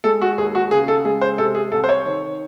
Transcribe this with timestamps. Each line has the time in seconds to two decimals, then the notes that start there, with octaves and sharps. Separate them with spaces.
0.04 G#3 A4
0.22 F#4
0.38 D#2 G#4
0.55 F#4
0.71 C#3 G#4
0.88 A4
1.05 G#3 G#4
1.21 C5
1.38 C3 A4
1.55 G#4
1.72 C2 A4
1.84 C5
1.89 C#5
2.05 D#3